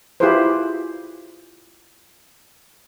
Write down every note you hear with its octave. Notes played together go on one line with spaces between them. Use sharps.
E4 F4 G4 G#4 B4 C5